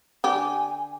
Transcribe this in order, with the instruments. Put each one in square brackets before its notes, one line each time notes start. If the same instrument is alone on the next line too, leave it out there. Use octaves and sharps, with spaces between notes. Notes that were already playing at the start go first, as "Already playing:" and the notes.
[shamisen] D3 G4 [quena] G#5